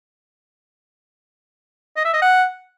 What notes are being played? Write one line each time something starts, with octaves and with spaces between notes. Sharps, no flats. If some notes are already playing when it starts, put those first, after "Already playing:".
D#5
E5
D#5
F#5